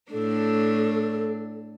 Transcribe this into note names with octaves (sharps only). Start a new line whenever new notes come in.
A2 D4 A4